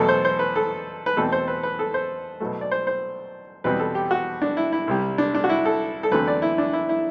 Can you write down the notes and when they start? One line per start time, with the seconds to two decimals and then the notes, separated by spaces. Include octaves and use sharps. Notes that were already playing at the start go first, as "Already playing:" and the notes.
Already playing: E2 B2 F#3 A3 A4
0.09 C5
0.25 C5
0.39 B4
0.56 A4
1.06 B4
1.17 E2 B2 A3 C4 A4
1.32 C5
1.48 B4
1.63 B4
1.79 A4
1.94 C5
2.40 B2 F#3 A3
2.61 D5
2.71 C5
2.87 C5
3.64 E2 B2 G3 C4 B4
3.79 A4
3.95 G4
4.11 F#4
4.42 D4
4.57 E4
4.72 E4
4.87 C2 C3 G3
5.18 D4
5.35 D4
5.44 F#4
5.49 E4
5.65 A4
6.03 A4
6.12 E2 D3 F#3 A3 C4 B4
6.27 D5
6.42 E4
6.58 D4
6.73 E4
6.89 E4